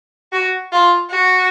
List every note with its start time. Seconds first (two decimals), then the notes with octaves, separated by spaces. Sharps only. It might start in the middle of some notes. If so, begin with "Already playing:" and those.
0.32 F#4
0.72 F4
1.11 F#4